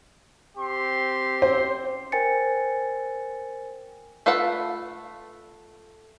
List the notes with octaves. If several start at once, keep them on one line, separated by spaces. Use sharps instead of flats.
C4 G4 C6
C#4 C5
A#4 C5 G5 G#5 A6 C#7
A3 F4 A4 B4 F#5